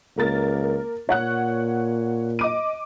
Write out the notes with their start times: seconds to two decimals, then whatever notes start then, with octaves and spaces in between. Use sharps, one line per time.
0.17 C#2 A#3 A#4 A6
1.09 A#2 C#5 F#5 F#6
2.39 D#5 D6 D#7